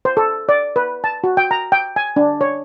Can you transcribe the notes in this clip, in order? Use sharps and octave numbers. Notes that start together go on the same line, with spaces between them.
C5
A4
D5
B4
A5
F#4
G5
A#5
G5
G#5
D4
C#5